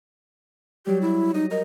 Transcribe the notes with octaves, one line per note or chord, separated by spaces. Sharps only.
F#3 G3 G4
E4
D#4 D#5
A#4 D#5